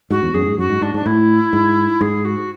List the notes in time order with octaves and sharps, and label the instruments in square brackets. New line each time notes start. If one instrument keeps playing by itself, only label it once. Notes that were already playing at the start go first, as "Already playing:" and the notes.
[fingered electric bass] G#2 [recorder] F#4
[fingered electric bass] E2
[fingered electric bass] F#2 [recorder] G#4
[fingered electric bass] A2
G#2
[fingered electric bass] F#2 [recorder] F#4
[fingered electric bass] G#2
[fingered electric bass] G#2 [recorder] D4
[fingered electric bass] G#2 [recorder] D4
[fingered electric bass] A2 [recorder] E4
[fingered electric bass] G#2
[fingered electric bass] G#2 [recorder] G#4
[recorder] F#4